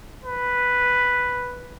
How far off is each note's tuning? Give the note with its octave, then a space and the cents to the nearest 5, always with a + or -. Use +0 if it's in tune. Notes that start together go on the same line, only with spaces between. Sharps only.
B4 +0